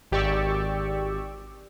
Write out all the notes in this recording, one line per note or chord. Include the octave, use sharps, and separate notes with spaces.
G#1 G4 D5 C#6 E6